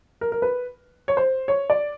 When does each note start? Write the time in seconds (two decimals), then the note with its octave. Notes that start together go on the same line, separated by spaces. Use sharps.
0.21 A#4
0.32 A#4
0.42 B4
1.08 C#5
1.17 C5
1.48 C#5
1.70 D5